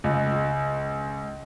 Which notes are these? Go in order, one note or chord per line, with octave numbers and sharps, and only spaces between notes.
C#2